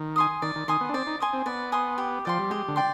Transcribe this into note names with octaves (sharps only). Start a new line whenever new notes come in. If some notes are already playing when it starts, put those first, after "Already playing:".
Already playing: D#3
G#5 C6 D#6
D#3 D5
D#3
D#3 G#5 C6 D#6
B3
D4
C4 D5
D#4
G#5 C6 D#6
C4
B3 D5
G#5 C6 D#6
G4
F3 D5 G5 C6
G3
G#3 G4
D3
D5 G5 C6